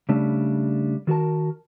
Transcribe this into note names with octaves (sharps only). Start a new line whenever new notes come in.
C#3 G3 A3 D4
D#3 F#4 A#4 A5